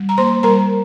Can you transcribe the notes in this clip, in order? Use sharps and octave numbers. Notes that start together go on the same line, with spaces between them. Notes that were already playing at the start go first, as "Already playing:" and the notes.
Already playing: G3
A#5
A#3 C5 C6
G3 A#4 A#5